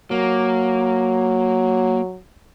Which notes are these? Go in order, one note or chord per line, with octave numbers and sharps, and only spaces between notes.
F#3 A#3